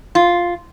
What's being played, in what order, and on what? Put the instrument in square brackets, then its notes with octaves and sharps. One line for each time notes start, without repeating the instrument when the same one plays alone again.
[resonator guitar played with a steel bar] F4